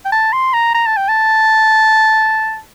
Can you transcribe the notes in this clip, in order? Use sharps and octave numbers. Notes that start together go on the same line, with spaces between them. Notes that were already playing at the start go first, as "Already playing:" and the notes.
G5
A5
C6
A#5
A#5
A5
G5
A5